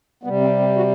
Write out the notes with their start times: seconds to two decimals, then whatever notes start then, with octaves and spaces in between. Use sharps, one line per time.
0.23 C3 G3 B3
0.41 C4
0.59 C4
0.77 F#4